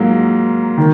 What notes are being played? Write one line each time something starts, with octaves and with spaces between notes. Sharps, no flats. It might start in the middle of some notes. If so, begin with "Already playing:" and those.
Already playing: G#2 F#3 A#3 F4
D#3